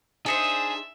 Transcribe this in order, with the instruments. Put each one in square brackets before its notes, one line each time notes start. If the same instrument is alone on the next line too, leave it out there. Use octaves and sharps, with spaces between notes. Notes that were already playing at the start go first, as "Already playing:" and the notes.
[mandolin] D4 D#4 C5 [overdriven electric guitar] G#4 [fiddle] E5